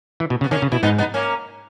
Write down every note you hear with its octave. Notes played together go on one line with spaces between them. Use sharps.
E3
B2
C#3
B3
D#3 A#3 C#4
C#3
B2 E4
G#2 B3 D#4
B3 D#4
A#3 C#4